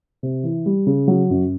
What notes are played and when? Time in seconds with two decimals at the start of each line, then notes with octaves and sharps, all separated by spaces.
0.23 C3
0.43 E3
0.66 G3
0.87 C#3
1.08 F#3
1.30 F#2